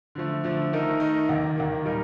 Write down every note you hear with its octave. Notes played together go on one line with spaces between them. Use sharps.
D3 F3 A3
D3 F3 A3
D#3 A3 D#4 A#4
D#3 A3 D#4 A#4
D#2 D#3 A#3
D#2 D#3 A#3
A#2 G3 A#3 D#4 A#4